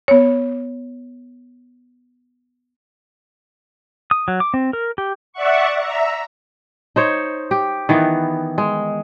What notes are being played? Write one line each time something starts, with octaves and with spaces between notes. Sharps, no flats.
B3 C#5
D#6
F#3
D6
C4
A#4
G4
D5 E5 F#5 C#6
E5 A#5
D#4 C5 C#5
G4
D#3 E3 B3
G#3